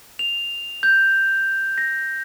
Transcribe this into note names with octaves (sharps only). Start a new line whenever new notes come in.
F7
G6
A#6